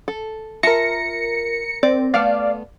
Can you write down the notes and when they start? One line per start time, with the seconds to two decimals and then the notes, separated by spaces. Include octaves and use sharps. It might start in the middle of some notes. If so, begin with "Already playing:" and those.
0.08 A4
0.63 F4 A#4 E5 A5 A#6 C#7
1.83 C4 D5
2.14 A3 B3 D5 F5